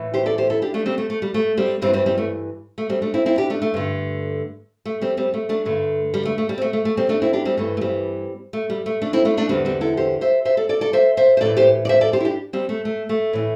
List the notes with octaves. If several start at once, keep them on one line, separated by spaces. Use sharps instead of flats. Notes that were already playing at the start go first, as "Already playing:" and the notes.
Already playing: A2 E3
G4 C5
A4 D5
G4 C5
E4 A4
D4 G4
A3 D4
G3 C4
A3
A3
G3
A3
G3 C4
G2 E3 G3 C4
G3 C4
G3 C4
A3
A3
G3 C4
A3 D4
C4 E4
C4 E4
D4 G4
A3 D4
A3
G2 D3
A3
G3 C4
G3 C4
A3
A3 D4
G2 D3 A3
G3
A3
A3
G3
C4
A3
A3
A3
G3 C4
A3 D4
C4 E4
D4 G4
G3 C4
G2 E3 A3
A3
G3 C4
A3
G3
A3
A3 D4
C4 E4
A3 D4
A3 D4
E2 D3 G3 C4
G3 C4
E4 A4
G4 C5
C5 E5
C5 E5
A4 D5
A4 D5
A4 D5
C5 E5
C5 E5
C5
A2 E3 A4 D5
G4 C5
D5
C5 E5
A4 D5
G4 C5
E4
D4 G4
G3 C4
A3
A3
A3
A2 E3